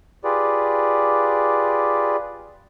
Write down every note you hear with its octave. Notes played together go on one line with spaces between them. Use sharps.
F4 G4 G#4 B4 D5